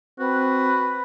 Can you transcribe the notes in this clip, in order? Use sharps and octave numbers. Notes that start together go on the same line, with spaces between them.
C4 F#4 B4